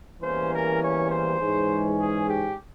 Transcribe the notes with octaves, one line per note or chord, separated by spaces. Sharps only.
E2 E3 G3 A#3 C#4 C5
A#4
C#5
C5
G#2 E3 G#3 C#4
G#4
G4